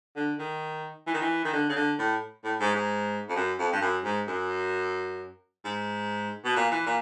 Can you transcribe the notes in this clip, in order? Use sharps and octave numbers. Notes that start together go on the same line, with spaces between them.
D3
D#3
E3
D#3
E3
D#3
D3
C#3
D3
A2
A2
G#2
G#2
F2
F#2
F2
G2
F#2
G#2
F#2
G#2
B2
A#2
E3
A#2